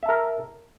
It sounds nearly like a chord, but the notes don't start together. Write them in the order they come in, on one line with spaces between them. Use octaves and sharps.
E5 A5 A#4